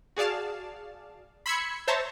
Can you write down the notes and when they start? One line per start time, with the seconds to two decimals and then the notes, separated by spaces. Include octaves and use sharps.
0.16 F#4 G#4 D5 F5 A5
1.46 B5 C6 E6 G#6 B6 C#7
1.88 C5 C#5 E5 A5 A#5